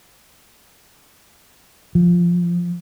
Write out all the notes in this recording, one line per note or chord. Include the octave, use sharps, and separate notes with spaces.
F3